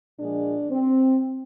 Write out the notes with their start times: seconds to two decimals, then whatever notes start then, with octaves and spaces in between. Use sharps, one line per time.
0.19 A#2 F3 G#3 D4
0.70 C4